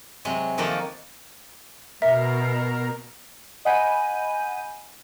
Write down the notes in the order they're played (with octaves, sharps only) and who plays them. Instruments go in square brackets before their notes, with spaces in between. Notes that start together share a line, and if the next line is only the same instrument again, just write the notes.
[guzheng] C3 F#3 G#3
D#3 F3 A#3 D#4 F#4 A4
[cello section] B2 [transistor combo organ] A#4 [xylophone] E5
[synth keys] D#5 F#5 G#5 B5 G6 D#7